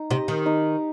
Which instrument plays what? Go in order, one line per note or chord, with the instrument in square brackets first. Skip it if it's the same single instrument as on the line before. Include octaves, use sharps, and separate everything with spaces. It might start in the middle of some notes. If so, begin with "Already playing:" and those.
Already playing: [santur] D#4
[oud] C3 [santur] G4 D#5
[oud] D#3
[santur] D#4